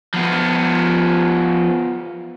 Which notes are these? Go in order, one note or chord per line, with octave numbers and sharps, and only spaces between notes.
F3 B3